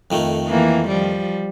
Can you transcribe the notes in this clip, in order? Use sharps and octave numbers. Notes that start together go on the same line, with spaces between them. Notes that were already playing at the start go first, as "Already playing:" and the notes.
F2 D#3 A3
E3 A#3
F3 G3